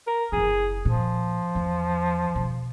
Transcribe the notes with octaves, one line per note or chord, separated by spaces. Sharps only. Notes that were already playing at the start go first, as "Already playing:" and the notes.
A#4
F#1 E4 G#4
A#2 F3
E2
B2 D3